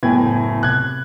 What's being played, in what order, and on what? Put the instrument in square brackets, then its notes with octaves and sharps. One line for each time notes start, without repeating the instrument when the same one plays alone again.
[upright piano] F#1 A2 G#6 [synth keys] B3 G5 G#5
[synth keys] C3 [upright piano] F#6 G#6